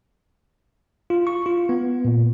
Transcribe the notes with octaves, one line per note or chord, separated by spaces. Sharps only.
F4
C#6
F4
B3
A#2